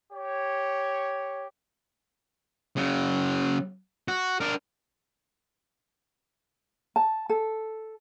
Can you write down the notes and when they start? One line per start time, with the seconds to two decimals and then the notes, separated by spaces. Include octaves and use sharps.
0.12 G4 C#5
2.77 C#3 F#3
4.08 F#4
4.40 D4 A#4
6.96 A5
7.29 A4